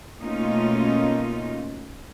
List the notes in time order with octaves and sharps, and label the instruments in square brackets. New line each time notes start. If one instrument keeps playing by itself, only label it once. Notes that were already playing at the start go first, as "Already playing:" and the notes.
[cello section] B2 A3 A#3 C#4 D#4 F4